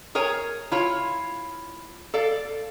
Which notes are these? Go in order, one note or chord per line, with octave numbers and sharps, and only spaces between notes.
G#4 A#4 C#5 G#5
E4 F4 C#5
A4 D5 F5